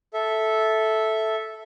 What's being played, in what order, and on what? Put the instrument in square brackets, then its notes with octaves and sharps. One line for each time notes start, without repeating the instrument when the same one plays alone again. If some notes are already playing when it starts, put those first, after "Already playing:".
[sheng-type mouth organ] A4 E5